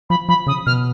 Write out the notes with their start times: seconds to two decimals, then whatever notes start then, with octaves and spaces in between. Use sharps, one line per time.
0.09 F3 B5
0.28 F3 B5
0.47 C#3 D#6
0.66 B2 F6